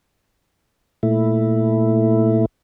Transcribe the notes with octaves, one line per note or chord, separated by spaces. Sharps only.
A#2 A3 E4